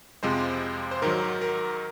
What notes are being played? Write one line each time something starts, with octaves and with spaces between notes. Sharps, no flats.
F2 C3 F3 G#3 C5
C5
G#2 D#3 F#3 A#4
A#4